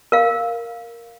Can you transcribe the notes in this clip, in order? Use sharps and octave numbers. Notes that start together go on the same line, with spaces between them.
A#4 F5